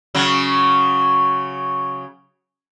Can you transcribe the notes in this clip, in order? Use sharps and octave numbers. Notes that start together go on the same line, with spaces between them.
C#3 F#3